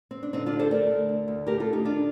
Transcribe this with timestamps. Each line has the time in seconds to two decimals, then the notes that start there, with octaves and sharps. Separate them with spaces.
0.11 C4
0.23 D4
0.33 D3 C4 D#4
0.46 D4 F4
0.53 D2
0.59 A4 C5
0.71 A3 A#4 D5
0.91 D2
1.09 D3
1.28 D2
1.46 A3 G4 A#4
1.60 F4 A4
1.66 D2
1.73 D#4 G4
1.84 D#3 D4 F4